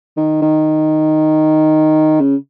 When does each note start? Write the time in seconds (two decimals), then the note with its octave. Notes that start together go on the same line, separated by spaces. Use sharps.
0.17 D#3
0.42 D#3
2.20 C#3